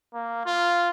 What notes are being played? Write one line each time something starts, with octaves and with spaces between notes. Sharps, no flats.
A#3
F4